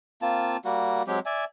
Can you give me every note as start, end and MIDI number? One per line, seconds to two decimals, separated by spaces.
0.22 0.57 58
0.22 0.57 60
0.22 0.57 65
0.22 0.57 81
0.65 1.03 55
0.65 1.03 58
0.65 1.03 66
1.07 1.19 54
1.07 1.19 56
1.07 1.19 60
1.07 1.19 67
1.26 1.45 74
1.26 1.45 76
1.26 1.45 80